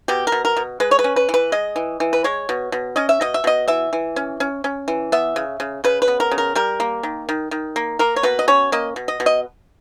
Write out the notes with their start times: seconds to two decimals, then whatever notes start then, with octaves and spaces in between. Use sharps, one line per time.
0.08 B2 G4
0.27 A#4
0.32 B2
0.45 A#4
0.57 B2
0.80 G#3 B4
0.91 C#5
0.99 B4
1.04 C#4
1.16 B4
1.29 E3
1.34 B4
1.52 G#3 D#5
1.76 E3
2.00 E3
2.13 B4
2.24 G#3 C#5
2.49 B2
2.72 B2
2.96 C#4 D#5
3.09 E5
3.21 B2 D#5
3.34 E5
3.44 B2 D#5
3.68 E3 E5
3.93 E3
4.16 C#4
4.40 C#4
4.64 C#4
4.88 E3
5.12 B3 E5
5.36 C#3
5.60 C#3
5.84 C#3 B4
6.02 B4
6.08 B3
6.20 A#4
6.31 C#3
6.38 A#4
6.55 G3 A#4
6.80 A#3
7.03 D#3
7.29 D#3
7.51 D#3
7.76 A#3
7.99 A#3 A#4
8.16 C#5
8.23 B2 B4
8.39 D#5
8.48 C#4 C#5
8.72 A#3 D#5
8.96 B2
9.08 D#5
9.20 B2
9.26 D#5